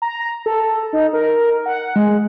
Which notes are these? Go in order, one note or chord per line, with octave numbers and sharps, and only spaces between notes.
A#5
A4
D#4
A#4
F#5
G#3